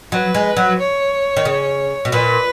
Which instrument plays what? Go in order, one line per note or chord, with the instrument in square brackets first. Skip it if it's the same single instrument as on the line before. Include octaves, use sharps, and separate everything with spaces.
[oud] F#3 [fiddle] B4
[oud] G#3
F#3
[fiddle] C#5
[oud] D#3
C#3
B2
[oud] A#2 [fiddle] B4